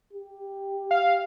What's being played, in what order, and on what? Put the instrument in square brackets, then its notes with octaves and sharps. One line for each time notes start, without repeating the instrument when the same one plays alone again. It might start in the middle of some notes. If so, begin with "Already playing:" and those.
[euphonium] G4
[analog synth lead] F5